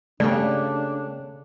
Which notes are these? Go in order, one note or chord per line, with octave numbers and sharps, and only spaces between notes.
C#3 A3 A#3 D4 G4 D5